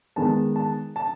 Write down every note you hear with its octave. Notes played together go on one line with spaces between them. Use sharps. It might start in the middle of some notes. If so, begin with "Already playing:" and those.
D#3 G#3 B3 A5
A5
A5